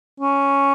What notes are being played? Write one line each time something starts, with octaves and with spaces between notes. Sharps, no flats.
C#4